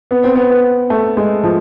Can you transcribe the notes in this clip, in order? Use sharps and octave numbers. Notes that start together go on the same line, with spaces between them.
B3
C4
B3
B3
A3
G#3
F3